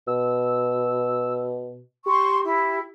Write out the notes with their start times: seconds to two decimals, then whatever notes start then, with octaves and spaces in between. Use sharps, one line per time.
0.07 B2 E6
2.06 G4 C6 C#6
2.45 E4